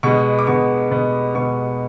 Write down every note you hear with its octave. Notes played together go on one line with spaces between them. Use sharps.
B2 G#3 B3 C#6
D6
B2 G#3 B3 C#6
B2 G#3 B3
B2 G#3 B3 C#6